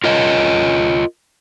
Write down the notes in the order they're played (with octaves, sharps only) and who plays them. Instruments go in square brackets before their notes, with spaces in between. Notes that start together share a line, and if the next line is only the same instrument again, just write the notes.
[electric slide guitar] F4 A#4 C#5 D#5